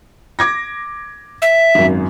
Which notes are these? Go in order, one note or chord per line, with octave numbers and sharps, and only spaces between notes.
D6 G#6 A#6
E5
G#1 F#2